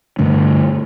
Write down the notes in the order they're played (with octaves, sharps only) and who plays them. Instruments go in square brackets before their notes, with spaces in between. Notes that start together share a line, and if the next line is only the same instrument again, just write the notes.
[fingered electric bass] G2 D3 A3 D4